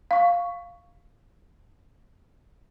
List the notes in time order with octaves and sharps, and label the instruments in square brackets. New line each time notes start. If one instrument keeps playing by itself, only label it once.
[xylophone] F5 C#6